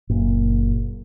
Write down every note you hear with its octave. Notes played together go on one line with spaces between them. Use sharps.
F#1 A#2